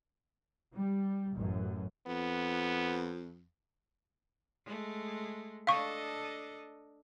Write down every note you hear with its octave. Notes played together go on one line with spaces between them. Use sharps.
G3
A1 F#2
F2 B3
G#3 A3
D4 A4 D#5 F5 C#6